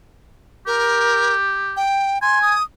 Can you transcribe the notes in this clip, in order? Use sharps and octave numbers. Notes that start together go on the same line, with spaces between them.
G4 A#4
G5
G#5 C6
D#6